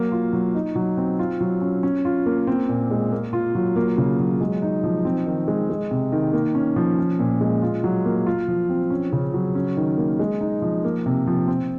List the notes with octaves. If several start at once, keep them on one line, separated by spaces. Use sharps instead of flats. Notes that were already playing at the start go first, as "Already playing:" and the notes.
Already playing: F#3 A#3
F4
F#3
D#4
F#3
C4
F4
F#3
C#4
C#4
F4
A#3
C4
A#2
G#3
A#3
F4
F#3
A#3
C#3
F#3
G#3
D#4
F3
C4
D#3
G#3
G#3
C3
D#3
A#3
C#4
F3
C#4
A#2
G#3
F4
F#3
A#3
F4
F3
C4
C#4
C#3
F#3
C#4
D#3
A#3
G#3
D#4
F3
A#3
C3
F3
C4